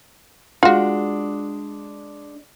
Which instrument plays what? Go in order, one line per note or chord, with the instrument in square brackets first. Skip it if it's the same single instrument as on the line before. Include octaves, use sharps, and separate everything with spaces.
[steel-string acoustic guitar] G#3 D4 [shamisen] F4 F#4